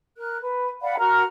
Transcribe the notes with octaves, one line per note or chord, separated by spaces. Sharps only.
A#4 F#6
B4
D5 F5 F#5 B5
F#4 A#4 A#5 F6